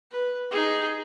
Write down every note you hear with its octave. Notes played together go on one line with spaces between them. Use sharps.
B4
D#4 G#4